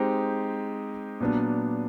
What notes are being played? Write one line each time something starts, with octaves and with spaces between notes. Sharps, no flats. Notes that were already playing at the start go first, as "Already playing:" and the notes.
Already playing: G#3 C4 D#4 G4
A#2 F#3 B3 D4